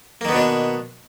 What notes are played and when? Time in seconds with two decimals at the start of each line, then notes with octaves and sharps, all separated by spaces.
0.21 A#3
0.25 D#3
0.29 B3
0.32 B2
0.36 D4